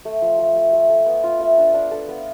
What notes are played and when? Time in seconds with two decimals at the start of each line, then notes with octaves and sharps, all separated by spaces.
0.05 A3
0.22 F3
0.39 A3
0.56 A3
0.73 A3
0.90 A4
1.06 B3
1.24 F4
1.41 E5
1.58 D4
1.74 D4
1.91 A4
2.09 B3